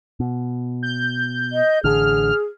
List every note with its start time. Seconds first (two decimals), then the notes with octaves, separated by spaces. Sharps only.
0.20 B2
0.83 G6
1.53 D#5
1.84 A1 D3 G#4 F6